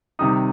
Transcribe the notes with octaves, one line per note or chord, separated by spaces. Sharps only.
C3 D#3 G3 D#4 D#6